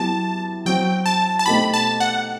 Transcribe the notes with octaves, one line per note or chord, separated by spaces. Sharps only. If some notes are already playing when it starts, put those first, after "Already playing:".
Already playing: F#3 B3 E4 G4 A5
F#3 C4 F#4 G5
A5
A5
B2 A3 C4 D#4 G4 B5
A5
F#5